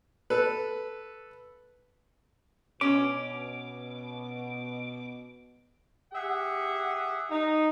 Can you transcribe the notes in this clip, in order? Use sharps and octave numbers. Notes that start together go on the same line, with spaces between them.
A4 B4
B2 C#4 D6
G4 G#4 E5 F#5
D#4